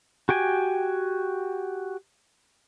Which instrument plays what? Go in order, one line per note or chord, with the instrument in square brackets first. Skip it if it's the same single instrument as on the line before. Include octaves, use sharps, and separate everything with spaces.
[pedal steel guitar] F#4 G4 G5 G#5